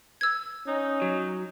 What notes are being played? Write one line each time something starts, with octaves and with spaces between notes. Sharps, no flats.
E6 G#6
C#4 D#4
F#3